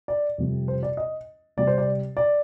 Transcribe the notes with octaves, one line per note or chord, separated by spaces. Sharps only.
D5
F2 C3 G3
C5
D5
D#5
C3 G3 D5
C5
D5
D5